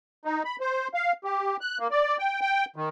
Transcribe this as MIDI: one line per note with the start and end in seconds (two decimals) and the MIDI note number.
0.25 0.43 63
0.45 0.56 83
0.60 0.88 72
0.94 1.12 77
1.24 1.57 67
1.61 1.78 90
1.79 1.88 58
1.91 2.16 74
2.19 2.40 79
2.41 2.65 79
2.76 2.89 51